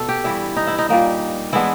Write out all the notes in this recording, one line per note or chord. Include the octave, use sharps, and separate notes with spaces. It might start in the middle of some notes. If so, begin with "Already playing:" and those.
Already playing: B2 A3 A4
G4
G2 E3 G3 E4
D#4
E4
D#4
A#2 G3 A#3 D#4
E3 G#3 B3 D4 E4